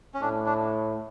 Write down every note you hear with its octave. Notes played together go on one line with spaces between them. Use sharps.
C#4
A2 D4
D4